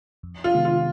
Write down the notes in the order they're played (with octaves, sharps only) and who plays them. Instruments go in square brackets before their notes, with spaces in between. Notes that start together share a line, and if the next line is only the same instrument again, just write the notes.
[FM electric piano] F2
[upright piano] F4
[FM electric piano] C3 D#3 G#3 B3
[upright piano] F4